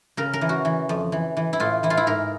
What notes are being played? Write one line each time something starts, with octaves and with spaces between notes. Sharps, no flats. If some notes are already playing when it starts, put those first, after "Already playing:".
C#3 A#4
A#4
E3
F#4
E3
F2
E3
E3
E4
A2 F4
E3 E4
F4
E4
G#2 A#4